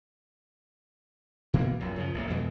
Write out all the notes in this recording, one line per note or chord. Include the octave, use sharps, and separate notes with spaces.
B2 E3 A#3 B3
A#1 F#2 A#2
F#2 C#3 F3
A1 A#2 A#3
F2 B2 E3 G#3